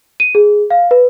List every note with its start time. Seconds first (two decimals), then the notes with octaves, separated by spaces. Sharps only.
0.20 D#7
0.35 G#4
0.70 F5
0.91 B4